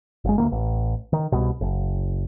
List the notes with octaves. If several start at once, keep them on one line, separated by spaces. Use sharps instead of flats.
F#1 G#3
D2 F3 A#3
A1
D#3
C2 B2
F#1